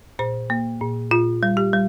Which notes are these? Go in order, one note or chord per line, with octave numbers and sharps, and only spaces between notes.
A#2 C5
A#3
A#2
A#2 F4
G3
G4
G3